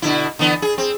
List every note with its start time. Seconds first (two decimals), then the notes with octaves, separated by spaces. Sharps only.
0.02 B2 D3 E4
0.39 D3 E3 B3
0.62 G#4
0.78 C4